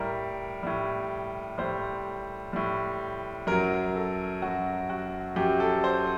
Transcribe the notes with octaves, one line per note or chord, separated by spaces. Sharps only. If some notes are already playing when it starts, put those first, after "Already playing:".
Already playing: A2 G3 A#4
A2 G3
A2 G3 C5
A2 G3
F#2 F#3 A#4
A4
F#2 F#3 F#4
F#4
F#2 F#3 G4
A4
C5